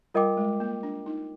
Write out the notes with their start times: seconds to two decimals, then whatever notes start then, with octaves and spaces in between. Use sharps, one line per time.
0.14 G3 F4 A#4 D#5 G5 D6
0.37 G#3
0.60 A#3
0.83 D4
1.06 D#4